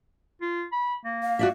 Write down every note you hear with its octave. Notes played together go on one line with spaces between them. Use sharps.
F4
B5
A#3
F5
F#4 D5 E5